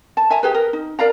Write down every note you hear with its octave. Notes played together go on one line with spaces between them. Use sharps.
A5
E5 G#5 A#5
G4 G#4 B4
A#4
D#4
A#4 D5 F5 A#5